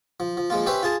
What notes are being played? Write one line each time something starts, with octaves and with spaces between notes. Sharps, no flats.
F3
F3
F3 G#3 A#3 F4
C#4 G4 B4 C5 E5
F4 G#4 A5